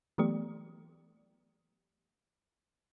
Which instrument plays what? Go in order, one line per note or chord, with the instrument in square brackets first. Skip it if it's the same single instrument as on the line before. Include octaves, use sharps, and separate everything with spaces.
[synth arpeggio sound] E3 F#3 A3 B3 G4 D5